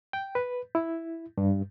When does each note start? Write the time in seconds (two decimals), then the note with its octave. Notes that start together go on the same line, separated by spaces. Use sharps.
0.13 G5
0.35 B4
0.75 E4
1.38 G2